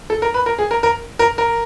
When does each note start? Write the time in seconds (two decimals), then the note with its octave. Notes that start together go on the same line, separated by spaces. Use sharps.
0.10 A4
0.22 A#4
0.34 B4
0.46 A#4
0.59 G#4
0.71 A#4
0.83 A#4
1.19 A#4
1.38 A#4